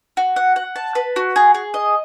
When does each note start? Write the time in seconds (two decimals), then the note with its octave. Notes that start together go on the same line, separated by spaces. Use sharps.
0.17 F#4
0.36 F#5
0.56 F#5
0.76 A5
0.95 B4
1.16 F#4
1.36 G#4
1.54 G#4
1.74 D#5